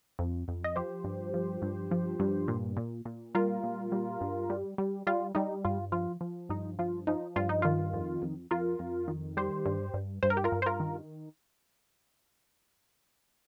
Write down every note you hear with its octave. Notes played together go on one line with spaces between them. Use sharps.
F2
F2
D#5
F3 G4 C5
G2
F3
G2
F3
G2
A#2
A#2
A#2
G3 F4 A#4
A#2
G3
G2
G3
G3
G3 F4
G3 D#4
G2 F4
F3 F4
F3
G2 D#4
F3 F4
F3 D#4
G2 F4
D#4
D#3 F4
F2
F2
F2 F4 A#4
F2
D#3
G3 G4 C5
G2
G2
G2 C5
A#4
G4
F4 A#4
G2
C5
F4 A#4
D#3